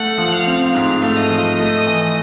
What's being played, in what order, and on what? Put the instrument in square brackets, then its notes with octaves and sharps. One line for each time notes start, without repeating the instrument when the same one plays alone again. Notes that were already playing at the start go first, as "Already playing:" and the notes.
Already playing: [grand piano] A3 [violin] F#5
[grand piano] F3
[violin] F5
[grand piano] C4
[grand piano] G#2 [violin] F5
[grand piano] A3
[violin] D#5
[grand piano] F3
A3
E3